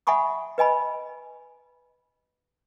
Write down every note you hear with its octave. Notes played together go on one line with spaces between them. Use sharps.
E5 F#5 G#5 B5 C#6 D#6
B4 D#5 G#5 B5